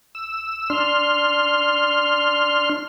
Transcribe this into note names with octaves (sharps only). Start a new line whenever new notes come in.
E6
D4 C6 F6